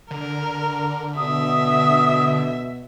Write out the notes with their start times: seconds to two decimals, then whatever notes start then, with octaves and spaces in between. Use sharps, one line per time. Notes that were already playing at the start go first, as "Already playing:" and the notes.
0.11 D3 A#4
1.17 B2 E5 D#6